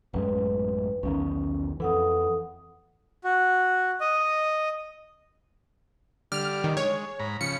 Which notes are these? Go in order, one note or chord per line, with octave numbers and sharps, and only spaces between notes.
A1 F#2 G#3 B4
B1 E2 D#3 C#4
F2 E3 A4 F#5 D#6
F#4
D#5
D3 G3 D5 F6
D#3
G#3 C#5
G#2 A#5 B5
C#3 F3 B5 C#7